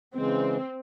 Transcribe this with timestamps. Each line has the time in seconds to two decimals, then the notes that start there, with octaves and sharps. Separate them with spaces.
0.15 C#3 E3 G#3 C4